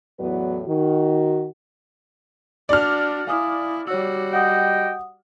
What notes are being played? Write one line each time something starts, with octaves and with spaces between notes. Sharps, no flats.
E2 A2 F#3 B3 B4 D5
D#3 F#4
D4 F#4 D5 F6
E4 F5 G#5 D#6
G3 F#4 C#5 E6
D#5 F#5 G5 D#6